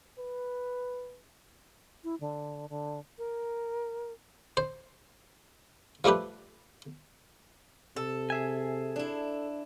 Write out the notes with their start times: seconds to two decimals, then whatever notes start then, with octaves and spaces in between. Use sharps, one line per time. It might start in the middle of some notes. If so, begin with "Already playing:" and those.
0.18 B4
2.04 E4
2.20 D3
2.69 D3
3.18 A#4
4.57 C5
6.04 F3 G3 A3 G4 B4
7.96 C3 A4
8.30 G#4 E5 G#5
8.96 D4 E4